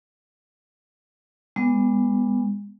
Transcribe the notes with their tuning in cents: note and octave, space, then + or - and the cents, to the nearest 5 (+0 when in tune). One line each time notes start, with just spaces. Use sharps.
G#3 -30 B3 +0